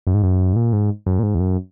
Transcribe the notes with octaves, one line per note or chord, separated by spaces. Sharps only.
F#2
G#2
F#2
G#2
A#2
G#2
F#2
A#2
G#2
E2
F#2